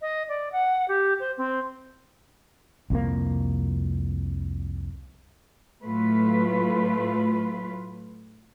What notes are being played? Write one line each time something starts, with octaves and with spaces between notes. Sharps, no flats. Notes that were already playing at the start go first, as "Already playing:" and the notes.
D#5
D5
F#5
G4
C5
C4
C2 F2 A#3
A2 F#3 A3 F4 B4